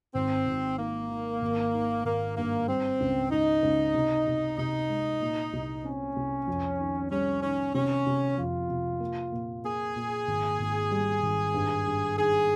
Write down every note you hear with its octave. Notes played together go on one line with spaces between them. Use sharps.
G#1 C4
G#1
D#3 A#3
D#3
G#1
D#3
G#1 A#3
G2 A#3
G3 C4
C#2
C#2 D#4
C#2
C3
C3
C3 D#4
G#3
A#2
C2
C4 C#4
C2
F2
D#3
G3 C#4
D#3 C#4
C3 C#4
C3
F2 F4
C3
A#3
A#2
A#3 G#4
A#2
G#1
G#1
G3
G#1
G2
G2
D#3 G#4